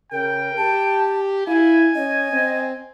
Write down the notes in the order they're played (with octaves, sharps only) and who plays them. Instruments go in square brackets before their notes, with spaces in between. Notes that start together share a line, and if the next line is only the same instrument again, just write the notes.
[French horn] C#3 [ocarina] A#4 [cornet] G5
[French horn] G4 [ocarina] A5
[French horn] E4 [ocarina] F5 [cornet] G#5
[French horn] C#4 [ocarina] D#5
[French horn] C4